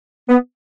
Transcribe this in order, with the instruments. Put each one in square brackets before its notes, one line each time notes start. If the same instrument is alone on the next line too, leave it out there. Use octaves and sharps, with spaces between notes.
[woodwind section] B3